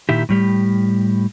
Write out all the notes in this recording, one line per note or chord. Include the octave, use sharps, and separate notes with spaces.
A#2 D#3 E4 G4
A2 G3 G4